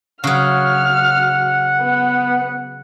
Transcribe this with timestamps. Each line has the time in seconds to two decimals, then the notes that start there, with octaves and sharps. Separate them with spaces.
0.24 C#3 F#3 F#5 F6
1.81 B3